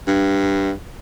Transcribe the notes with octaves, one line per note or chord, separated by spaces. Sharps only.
G2